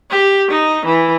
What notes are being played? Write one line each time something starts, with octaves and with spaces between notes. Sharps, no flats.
G4
D#4
E3